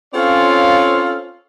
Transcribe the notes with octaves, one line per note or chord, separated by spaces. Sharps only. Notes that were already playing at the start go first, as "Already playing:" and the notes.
C4 C#4 F4 A4 C#5 F5